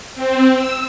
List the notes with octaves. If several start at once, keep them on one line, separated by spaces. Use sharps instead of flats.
C4
E6